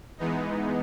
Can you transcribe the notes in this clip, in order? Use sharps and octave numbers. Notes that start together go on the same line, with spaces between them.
E3 G#3 B3 D#4